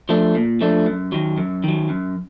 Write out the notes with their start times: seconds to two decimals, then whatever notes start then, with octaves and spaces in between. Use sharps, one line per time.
0.09 F3 A3 D4
0.35 A#2
0.61 F3 A3 D4
0.86 F#2
1.12 D#3 F#3
1.38 F#2
1.64 D#3 F#3
1.89 F#2